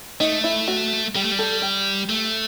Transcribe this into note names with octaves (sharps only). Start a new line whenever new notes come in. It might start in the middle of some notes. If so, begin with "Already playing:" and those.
A3 D#4
E4
F#4
G3 G4
A3
G3
A4
G4
A3